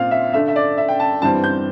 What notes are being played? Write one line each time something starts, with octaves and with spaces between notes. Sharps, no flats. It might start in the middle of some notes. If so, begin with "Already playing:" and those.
Already playing: A#2 C4 F5
E5
D3 A3 D4 E5
E5
D5
E5
G5
A5
G2 E3 G3 C4 A5
G6